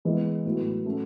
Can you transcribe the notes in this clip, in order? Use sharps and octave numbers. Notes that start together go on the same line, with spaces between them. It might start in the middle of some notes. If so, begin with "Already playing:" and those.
E3 G#3 B3 E4
A2 F#3 B3 E4
F#3 A3 C#4 F#4